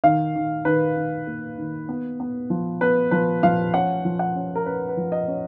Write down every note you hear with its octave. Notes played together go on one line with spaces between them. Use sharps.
D#3 F5
D#3
D#3 B4
D#3
A#3
D#3
B3
B3
F3
B3 B4
F3 B4
F3 F5
C#4 F#5
F3
F#5
C#4
A#4
C#4 B4
B4
F3
D#5
C#4